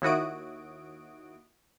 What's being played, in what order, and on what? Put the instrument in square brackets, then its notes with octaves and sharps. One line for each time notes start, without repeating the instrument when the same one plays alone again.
[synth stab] D#2 E4 F#4 D#6 D7